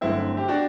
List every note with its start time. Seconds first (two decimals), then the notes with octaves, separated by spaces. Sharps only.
0.01 G1 F#2 D3 A3 C4 E4
0.37 G4
0.48 D4 F#4